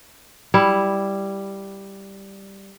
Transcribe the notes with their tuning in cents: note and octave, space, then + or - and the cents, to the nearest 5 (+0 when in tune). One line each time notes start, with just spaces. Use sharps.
G3 +0 E4 +0